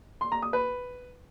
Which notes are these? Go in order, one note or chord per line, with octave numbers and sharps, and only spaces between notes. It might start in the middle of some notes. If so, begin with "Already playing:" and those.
C6
A#5
D#6
B4